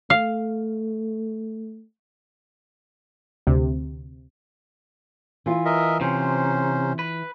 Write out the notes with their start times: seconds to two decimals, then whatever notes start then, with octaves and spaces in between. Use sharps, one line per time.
0.10 A3 F5
3.47 D2 C3
5.46 E3 F4
5.65 A#4 D#5 E5
6.01 C3 C#4 C5
6.99 B4